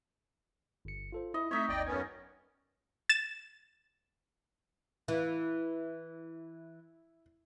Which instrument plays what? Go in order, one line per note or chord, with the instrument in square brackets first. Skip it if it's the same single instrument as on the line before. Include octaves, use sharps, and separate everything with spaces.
[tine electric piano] G1 C#7
F4 A4 C5
[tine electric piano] E4 [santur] D#5
[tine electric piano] A3 C4 [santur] D#4 C#5 [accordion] E5
[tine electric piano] G#1 D#2 [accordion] D5 D#5 G5
[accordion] F#2 B3 C#4 [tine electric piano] G#6 A6
[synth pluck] A6 E7
[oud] E3 [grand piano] E4